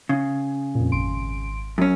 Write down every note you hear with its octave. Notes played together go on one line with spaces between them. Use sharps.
C#3
F2 A#2
G#1 C6 D7
F#2 C#4